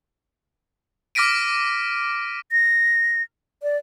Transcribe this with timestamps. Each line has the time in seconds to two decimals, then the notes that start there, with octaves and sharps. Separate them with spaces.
1.15 D6 F6 A#6 B6 D7 D#7
2.52 A#6
3.63 D5